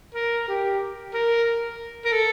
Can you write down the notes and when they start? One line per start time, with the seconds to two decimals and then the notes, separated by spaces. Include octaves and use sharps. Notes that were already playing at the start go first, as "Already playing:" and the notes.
0.15 A#4
0.48 G4
1.13 A#4
2.05 A#4
2.12 A4